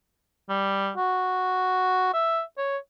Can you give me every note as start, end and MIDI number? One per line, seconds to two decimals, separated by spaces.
0.49 0.90 55
0.97 2.10 66
2.14 2.41 76
2.58 2.77 73